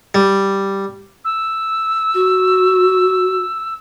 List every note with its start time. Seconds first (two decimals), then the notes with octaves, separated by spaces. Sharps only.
0.15 G3
1.25 E6
2.14 F#4